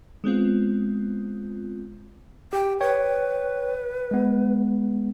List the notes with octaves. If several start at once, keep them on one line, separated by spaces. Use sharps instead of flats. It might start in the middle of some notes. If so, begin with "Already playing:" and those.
G#3 B3 C4 F4
G4 G5
B4 C#5 G5
G#3 B3